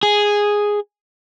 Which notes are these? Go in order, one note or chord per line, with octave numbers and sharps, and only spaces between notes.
G#4